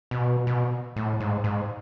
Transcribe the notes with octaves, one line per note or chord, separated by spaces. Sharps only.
B2
B2
A2
G#2
G#2